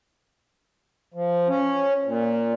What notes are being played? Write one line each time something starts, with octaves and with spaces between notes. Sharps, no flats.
F3
C#4
A#2